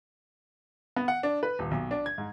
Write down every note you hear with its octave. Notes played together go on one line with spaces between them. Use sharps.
B3
F#5
D4
B4
D#1
B1
D4
G#6
G#2